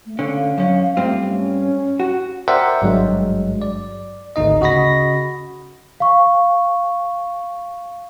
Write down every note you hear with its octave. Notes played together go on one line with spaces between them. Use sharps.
A3
D3 C#4 F5
F#2 C#4
G2 A3 C4 F4
C#4
F#4
A#4 C5 D5 E5 F#5 G5
G#1 G2 F#3 G#3
D5
G#1 D2 D#4 D#5
C#3 F#4 D#5 B5 A#6
F5 C#6